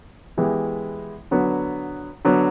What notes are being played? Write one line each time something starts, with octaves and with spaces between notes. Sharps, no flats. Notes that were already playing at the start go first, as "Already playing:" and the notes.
E3 G#3 B3 E4 G4
D3 F#3 B3
D3 F#3 B3